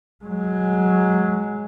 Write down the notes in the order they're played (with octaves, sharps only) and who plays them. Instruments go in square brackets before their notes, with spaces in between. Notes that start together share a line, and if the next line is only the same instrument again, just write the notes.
[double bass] F#3 G#3